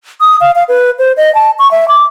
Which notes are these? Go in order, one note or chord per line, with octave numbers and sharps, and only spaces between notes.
D#6
F5
F5
B4
C5
D#5
A5
C#6
E5
D6